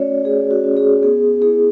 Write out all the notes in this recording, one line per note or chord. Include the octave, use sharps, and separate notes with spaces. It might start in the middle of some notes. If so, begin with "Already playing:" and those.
Already playing: A3 C#4 F#4 C#5 D5
A3 G#4
F#4
C#4 F#4
G#4
B3 G#4
E4 G#4